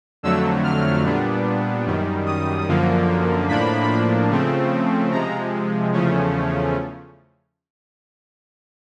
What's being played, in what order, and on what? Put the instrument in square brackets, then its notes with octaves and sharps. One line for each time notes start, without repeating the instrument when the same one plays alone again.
[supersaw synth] F2 D3 F#3 A3 E6
F6
A#2 G3 B3 D4
F#2 D#3 G3
D#6
F#2 D3 F3 A#3
A2 F3 A#3 D4 B5
C#3 F3 A3 C4
C3 F3 G#3 A#5
E2 C#3 F3 A3 C#4